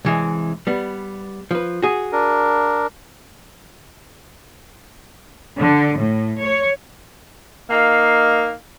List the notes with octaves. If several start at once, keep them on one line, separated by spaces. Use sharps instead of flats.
C2 E3 G#3
G3 B3
F3 B4
F#4 G#4
D4 A#4
D3
A2
C#5
A#3 D#4 F5